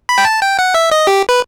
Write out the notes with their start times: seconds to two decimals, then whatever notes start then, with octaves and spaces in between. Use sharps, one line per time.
0.09 B5
0.18 G5
0.25 A5
0.42 G5
0.59 F#5
0.74 E5
0.92 D#5
1.07 G4
1.29 B4